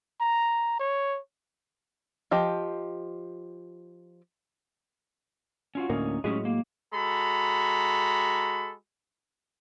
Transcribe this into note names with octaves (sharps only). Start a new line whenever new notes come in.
A#5
C#5
F3 G4 D#5
C#4 F4 F#4
D2 A2 A#3 C#4 D#4
A2 F#3 G#3 C#4 G4 G#4
A#3
G#3 F#4 A4 A#5 B5